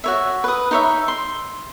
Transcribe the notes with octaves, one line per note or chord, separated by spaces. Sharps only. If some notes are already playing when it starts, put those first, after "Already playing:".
F#4 C#5 E5
B4 D#6
D#4 C#5 E5
C6